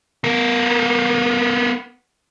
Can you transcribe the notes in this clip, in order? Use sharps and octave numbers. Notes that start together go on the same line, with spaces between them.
B3 A#4